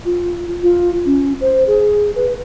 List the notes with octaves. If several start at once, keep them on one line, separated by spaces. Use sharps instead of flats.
F4
F4
C#4
C5
G#4
B4